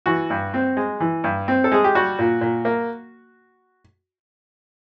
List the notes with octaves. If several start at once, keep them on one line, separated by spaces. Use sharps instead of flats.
E3 F#4
G2
C4
G#3
E3
G2
C4
A4
G#3 G#4
G4
G3 F#4
A#2
A#2
A#3